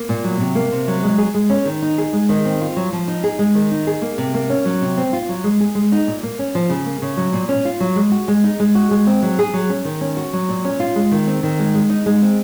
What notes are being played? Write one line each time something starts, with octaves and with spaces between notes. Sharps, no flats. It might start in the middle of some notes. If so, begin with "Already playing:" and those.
Already playing: A#3
A#2
F#3
C3
A#3
C3
F#3
G#3
G#4
G#3
C#4
D#3
D#4
G#4
G#3
D#3
C4
F4
F#3
F3
D#4
G#4
G#3
D#3
D#4
G#4
A#3
C3
A#3
C#4
F#3
C3
C4
F4
F#3
G#3
G#4
G#3
D#4
A#2
A#3
C#4
F3
C#3
A#3
C#3
F#3
A#2
C#4
F4
F#3
G#3
F#4
G#3
D#4
G#3
F#4
G#3
C4
F#3
G#4
F#3
C#4
D#3
C#4
F#4
F#3
A#2
C#4
F4
G#3
D#3
C4
D#3
G#3
G#3
D#4
G#3
C4